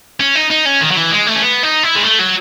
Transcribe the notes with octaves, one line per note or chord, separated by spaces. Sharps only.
C#4
D#4
D#4
C#4
D#3
F#3
E3
G#3
A3
C#4
B3
D#4
E4
G#3
A3
F#3